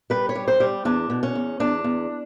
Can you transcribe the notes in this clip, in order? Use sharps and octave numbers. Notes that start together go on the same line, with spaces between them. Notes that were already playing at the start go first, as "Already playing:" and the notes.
G3 B4
C#5
G3
C5
G3
E2 D4
B2
C#4
E2
E2 D4
E2